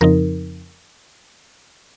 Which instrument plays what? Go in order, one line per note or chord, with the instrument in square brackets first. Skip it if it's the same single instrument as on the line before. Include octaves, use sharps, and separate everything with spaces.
[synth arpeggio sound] F2 C#3 F3 C4 D#4 A#4